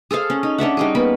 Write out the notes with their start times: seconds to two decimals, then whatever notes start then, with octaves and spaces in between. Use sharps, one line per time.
0.11 G#4 A4 C5 F5
0.30 C#4
0.43 D#4
0.58 C#4 D4 E5 F#5
0.77 G3 D#4 G#4
0.95 A#3 B3 B5